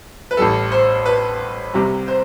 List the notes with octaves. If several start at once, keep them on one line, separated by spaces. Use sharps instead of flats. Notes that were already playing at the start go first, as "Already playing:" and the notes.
B4
A1 A2 G3 A4
C5
B4
C2 C3 G3 G4
C5